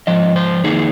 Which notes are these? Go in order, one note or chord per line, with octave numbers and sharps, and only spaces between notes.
G#2 F3 D#5
C5
F2 D#3 A#3 D#4 G#4